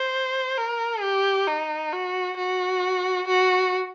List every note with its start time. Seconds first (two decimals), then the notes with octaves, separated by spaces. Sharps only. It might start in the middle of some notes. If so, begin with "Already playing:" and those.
Already playing: C5
0.58 A#4
1.02 G4
1.47 D#4
1.93 F#4
2.37 F#4
3.28 F#4